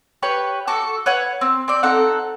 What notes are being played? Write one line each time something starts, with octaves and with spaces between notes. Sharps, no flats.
G4 B4 C#5
F#4 A4 D6
B4 C#5 F#5
C4
C4 D5
C4 D#4 A4 F#5